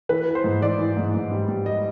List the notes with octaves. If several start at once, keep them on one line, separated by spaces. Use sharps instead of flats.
E3 B4
E3
C5
G#2
E3 D5
E3
G#2
G#2
G3
G3
D#5